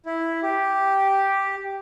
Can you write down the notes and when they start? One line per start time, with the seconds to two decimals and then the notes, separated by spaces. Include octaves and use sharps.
0.05 E4
0.43 G4